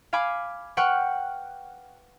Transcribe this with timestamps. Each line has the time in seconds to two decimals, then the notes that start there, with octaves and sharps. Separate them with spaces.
0.13 F5 G#5 B5 D6
0.77 B4 F#5 G5 C#6 F6 F#6